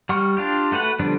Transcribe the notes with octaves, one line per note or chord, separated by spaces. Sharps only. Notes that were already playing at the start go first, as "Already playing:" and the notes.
G3 F#5 C#6 F6
D4 F4 G4
A3 F#4 B4 F#5
D3 F3 G3 B3 D4